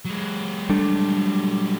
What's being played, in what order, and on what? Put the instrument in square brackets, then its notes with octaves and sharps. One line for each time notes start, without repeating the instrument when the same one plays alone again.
[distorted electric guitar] F#3 G#3
[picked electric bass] G3 A3 D4